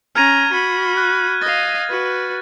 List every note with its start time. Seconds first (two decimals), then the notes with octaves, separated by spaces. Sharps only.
0.16 C#4 A#5 F6 G#6 D#7
0.52 F#4 B5
0.97 F#6
1.42 D#5 F5 A6
1.90 F#4 B4